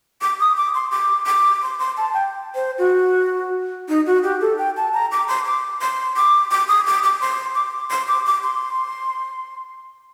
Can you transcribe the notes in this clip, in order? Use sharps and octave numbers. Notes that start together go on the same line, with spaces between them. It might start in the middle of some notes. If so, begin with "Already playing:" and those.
D6
D#6
D6
C6
D6
D6
C6
C6
A5
G5
C5
F#4
D#4
F#4
G4
A4
G5
A5
A#5
D6
C6
D6
C6
D6
D6
D#6
D6
D6
C6
D6
C6
D6
D6
C6